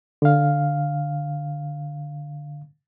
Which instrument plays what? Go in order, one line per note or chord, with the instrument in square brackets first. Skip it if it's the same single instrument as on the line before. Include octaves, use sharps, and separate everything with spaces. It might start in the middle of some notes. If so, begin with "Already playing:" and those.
[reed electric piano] D3 F5